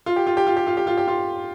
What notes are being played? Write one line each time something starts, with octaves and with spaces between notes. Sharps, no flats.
F4
G4
F4
G4
F4
G4
F4
G4
F4
G4
F4